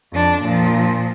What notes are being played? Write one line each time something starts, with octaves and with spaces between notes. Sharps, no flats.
F2 D4
A#2 F3